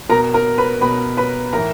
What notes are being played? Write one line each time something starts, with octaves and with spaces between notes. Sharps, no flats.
B2 A#4 A#5
A#4 A#5
B4 B5
B2 B4 B5
B4 B5
A2 E3 A#4 A#5